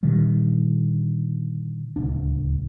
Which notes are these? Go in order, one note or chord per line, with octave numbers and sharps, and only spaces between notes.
A#2 D3 D#3 G3
D1 C#2 D4